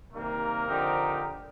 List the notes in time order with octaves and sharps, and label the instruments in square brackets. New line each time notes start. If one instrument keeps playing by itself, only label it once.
[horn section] C3 D#3 G3 A#3 [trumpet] A#4
[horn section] D3 F3 C4 D#4 G4